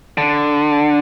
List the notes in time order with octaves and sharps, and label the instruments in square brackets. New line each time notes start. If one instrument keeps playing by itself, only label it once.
[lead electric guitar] D3